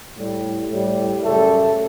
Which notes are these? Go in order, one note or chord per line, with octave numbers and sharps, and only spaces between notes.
A2 G3
A2 G3
F#2 C#3 G3 A3 A4